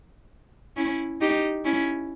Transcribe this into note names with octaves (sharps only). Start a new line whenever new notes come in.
C#4 E4
D#4 G4
C#4 E4